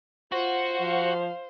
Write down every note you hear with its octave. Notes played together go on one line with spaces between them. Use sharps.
F4 F#4 C5
F3 F5